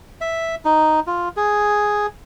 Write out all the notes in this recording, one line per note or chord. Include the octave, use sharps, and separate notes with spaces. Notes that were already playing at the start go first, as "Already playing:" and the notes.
E5
D#4
F4
G#4